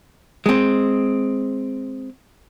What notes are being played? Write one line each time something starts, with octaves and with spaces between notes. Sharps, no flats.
G#3 C4